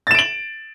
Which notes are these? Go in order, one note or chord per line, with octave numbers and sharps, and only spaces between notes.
A6 D7 E7 F#7